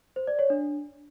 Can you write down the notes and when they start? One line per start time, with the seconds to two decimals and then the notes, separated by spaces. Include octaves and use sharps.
0.16 C5
0.27 D5
0.39 C#5
0.50 D4